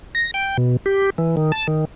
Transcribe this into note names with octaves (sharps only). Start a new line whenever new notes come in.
A#6
G5
B2
G4
E3
D#3
A5
D#3